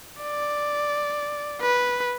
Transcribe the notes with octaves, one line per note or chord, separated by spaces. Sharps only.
D5
B4